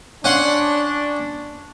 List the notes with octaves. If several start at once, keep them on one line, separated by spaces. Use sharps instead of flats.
C#4 D4 F#5 C6